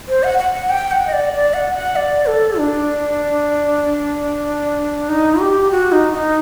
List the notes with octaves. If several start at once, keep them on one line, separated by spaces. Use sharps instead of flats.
C5
F#5
F#5
F#5
G5
F#5
D#5
D5
D5
F#5
F#5
D5
A4
D4
D#4
G4
F#4
D#4
D#4